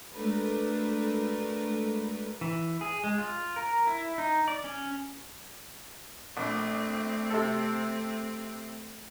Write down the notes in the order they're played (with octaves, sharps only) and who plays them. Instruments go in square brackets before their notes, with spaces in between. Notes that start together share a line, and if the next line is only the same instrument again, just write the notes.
[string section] G#3 A3 D4 F#4 A#4 B4
[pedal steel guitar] E3
G#4
G#3
F4
A#4
E4
D#4
D5
C#4
[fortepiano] A#1 [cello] A3 C4
[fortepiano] C3 A4